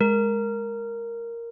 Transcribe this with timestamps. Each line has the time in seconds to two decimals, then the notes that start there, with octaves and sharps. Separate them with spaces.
0.01 G#3 A#4